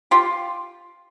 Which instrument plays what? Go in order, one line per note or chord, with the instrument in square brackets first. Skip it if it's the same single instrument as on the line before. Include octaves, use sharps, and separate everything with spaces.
[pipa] F4 G4